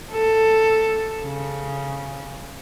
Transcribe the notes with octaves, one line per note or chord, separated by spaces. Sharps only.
A4
C#3